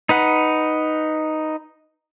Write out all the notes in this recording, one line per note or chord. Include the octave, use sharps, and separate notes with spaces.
D#4 B4 F#5